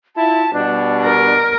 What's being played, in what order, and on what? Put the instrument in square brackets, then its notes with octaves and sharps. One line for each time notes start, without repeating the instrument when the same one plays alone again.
[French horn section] E4 F4 [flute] A5
[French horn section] B2 G3 [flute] D4
[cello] A#4